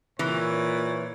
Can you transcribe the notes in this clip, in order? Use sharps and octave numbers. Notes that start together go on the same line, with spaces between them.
A#2 E3 C#5